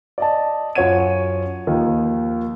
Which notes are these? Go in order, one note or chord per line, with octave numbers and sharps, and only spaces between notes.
D5 D#5 A5
F#2 F4 C#5 F#5 G#6 D#7
D#2 D#3 F3 A#3